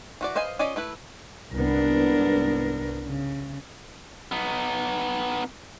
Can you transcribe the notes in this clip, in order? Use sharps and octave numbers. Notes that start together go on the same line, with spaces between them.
E3 F#4 D5
B4 C5 D#5 F5 G#5
C#4 F4 D5 D#5 G#5
A3 E4 B4
C2 G#2 B3 D4 A#4
C#3
B3 D#4